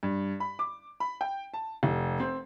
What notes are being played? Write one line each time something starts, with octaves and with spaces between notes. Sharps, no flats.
G2
B5
D6
B5
G5
A5
F1
C4